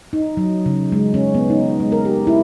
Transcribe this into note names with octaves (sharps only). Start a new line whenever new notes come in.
D#4
F#3
C#3
G#3
C#4
B3
D#4
G#3
A#4
G4
E4